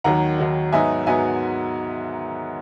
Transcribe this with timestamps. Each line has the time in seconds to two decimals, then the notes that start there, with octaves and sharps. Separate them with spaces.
0.04 D#2 D#3 F#3 F#5 A#5
0.39 D#2 D#3 F#3
0.72 G#2 F#3 B3 D#4 E5 G#5
1.06 G#2 F#3 B3 D#4 E5 G#5